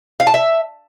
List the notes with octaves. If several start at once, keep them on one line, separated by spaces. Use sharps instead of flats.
F5
A5
E5